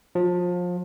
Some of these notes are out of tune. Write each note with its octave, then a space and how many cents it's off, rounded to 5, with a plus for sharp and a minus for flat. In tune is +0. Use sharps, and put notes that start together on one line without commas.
F3 +30